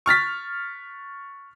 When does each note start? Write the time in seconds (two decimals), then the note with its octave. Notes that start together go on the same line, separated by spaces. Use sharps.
0.06 C#6 F6 A6 B6